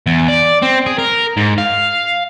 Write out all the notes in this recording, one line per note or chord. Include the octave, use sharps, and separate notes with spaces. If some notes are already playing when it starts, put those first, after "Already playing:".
E2
D5
C4
G#4
A#4
G#2
F5